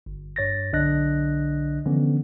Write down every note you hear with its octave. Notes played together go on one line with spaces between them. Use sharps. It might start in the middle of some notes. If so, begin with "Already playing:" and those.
G1
G2 C#5 A6 A#6
B1 D3 D4 D#5 F#6 A#6
D3 E3 F3 B3 C#4